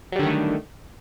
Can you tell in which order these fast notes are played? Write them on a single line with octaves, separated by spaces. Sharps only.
F#3 G3 D3 D#3 A3